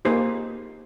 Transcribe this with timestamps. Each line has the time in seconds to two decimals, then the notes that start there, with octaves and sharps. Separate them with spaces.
0.05 A#3 D#4 G4 G#4 C5